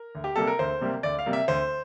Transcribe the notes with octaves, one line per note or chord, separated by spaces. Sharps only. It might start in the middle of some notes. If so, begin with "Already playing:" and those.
Already playing: A#4
D2
G4
C3 G3 A#3 A4
A#4
D2 C5
C3 G3 A#3
D2 D5
F5
C3 G3 A#3
E5
D2 C5